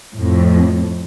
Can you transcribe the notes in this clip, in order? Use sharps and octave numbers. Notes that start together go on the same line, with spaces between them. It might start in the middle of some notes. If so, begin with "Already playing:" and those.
F2 A2